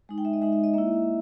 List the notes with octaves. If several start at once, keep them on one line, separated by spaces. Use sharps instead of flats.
G#3 D#4
G5
E5
D#5
G#3 D#4 E5
E5
D#5
A#3 E4 E5